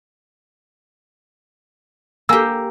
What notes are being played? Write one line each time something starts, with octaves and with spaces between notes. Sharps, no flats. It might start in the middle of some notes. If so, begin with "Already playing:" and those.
A#3 G4 G#5 E6